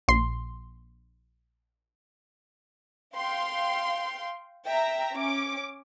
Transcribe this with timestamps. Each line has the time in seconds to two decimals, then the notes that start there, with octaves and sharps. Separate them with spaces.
0.08 A#1 C6
3.16 F5 G5 C6
4.67 E5 G5 A#5
5.15 C#4 D6